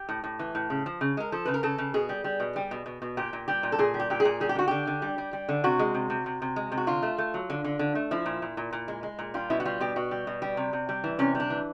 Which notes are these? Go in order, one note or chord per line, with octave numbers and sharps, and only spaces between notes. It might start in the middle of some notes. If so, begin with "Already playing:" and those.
Already playing: G4
A2
A2
E3
A2
C#3
F3
C#3
G#3 A#4
F3 A4
C#3 B4
A#4
C#3 A4
C#3
B2 G#4
G3
G3
B2
G3
B2
B2
B2
A#2 G4
A#2
G3 G4
A#2
A4
A#2 G#4
G3
G4
A#2 G4
G#4
A#2
G3 G#4
G4
D3 F#4
D3 G4
D3
G3
G3
G3
D3
C3 F#4
G#3
C3
C3
C3
C3
G#3
C3
F#4
D3 F4
A3
A3
F#3
D3
D3
D3
A3
F3 E4
A#2
A#2
A#2
A#2
G#3
G#3
A#2
G3 F4
B2 E4
F#4
G3 F4
B2 G4
B2 F#4
G3
B2
G3
C3
C3
G3
E3
C3 C#4
G3 D4
E3